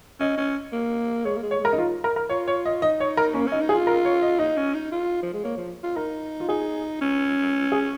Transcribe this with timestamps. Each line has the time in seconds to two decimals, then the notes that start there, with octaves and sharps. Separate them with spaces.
0.20 C#4 D#5
0.38 C#4
0.73 A#3
1.25 G#3 C#5
1.37 A#3
1.43 G#3
1.51 C#5
1.60 G#3 A#4
1.73 D#4
1.78 F4
2.04 A#4
2.16 A#4
2.29 F4 C#5
2.48 C#5
2.65 D#5
2.82 D#4 D#5
3.00 C#5
3.17 A#4
3.34 A#3 C#4
3.48 C#4 D#4
3.61 D#4
3.69 G#4
3.74 F4
3.87 A#4
4.05 C#5
4.22 D#5
4.39 D#4 D#5
4.57 C#4
4.74 D#4
4.92 F4
5.23 F3
5.34 G#3
5.44 A#3 C#5
5.58 F3
5.83 F4
5.96 D#4 A#4
6.40 F4
6.49 D#4 G#4
7.02 C#4
7.72 G#4